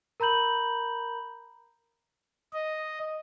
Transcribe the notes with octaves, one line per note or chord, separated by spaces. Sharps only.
A#4 A#5 B5 G6 F#7
D#5